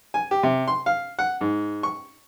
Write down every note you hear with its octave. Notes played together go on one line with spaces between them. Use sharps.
G#5
G4
C3
C6
F5
F#5
G#2
C#6